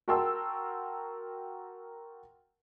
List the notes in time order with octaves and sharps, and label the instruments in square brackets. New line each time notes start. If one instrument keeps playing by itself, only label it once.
[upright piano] F#4 A#4 G5 A5 C6 E6